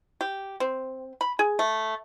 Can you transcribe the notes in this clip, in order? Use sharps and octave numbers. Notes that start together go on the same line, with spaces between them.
G4
C4
B5
G#4
A3